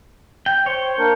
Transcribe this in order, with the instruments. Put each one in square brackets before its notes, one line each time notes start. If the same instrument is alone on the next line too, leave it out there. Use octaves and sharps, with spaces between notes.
[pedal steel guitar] G5
[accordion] C5 [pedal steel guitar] C#5 G5
[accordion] A#3 D4 A#4